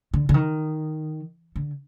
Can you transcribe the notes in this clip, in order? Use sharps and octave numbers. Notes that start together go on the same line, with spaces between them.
D3
D3
D#3
D3